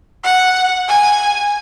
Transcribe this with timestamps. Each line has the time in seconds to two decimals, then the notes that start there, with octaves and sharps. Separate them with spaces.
0.24 F#5
0.89 G#5